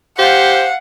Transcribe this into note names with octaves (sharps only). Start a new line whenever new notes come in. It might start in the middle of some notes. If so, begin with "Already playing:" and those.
G4 C5 F5 F#5